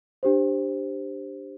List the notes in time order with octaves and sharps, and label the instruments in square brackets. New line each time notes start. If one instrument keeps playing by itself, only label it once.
[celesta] D4 G4 C5